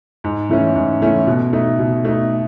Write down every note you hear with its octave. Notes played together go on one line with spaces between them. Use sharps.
G#2
E3 A3 C#4
G#2
E3 A3 C#4
B2
A3 D#4
B2
A3 D#4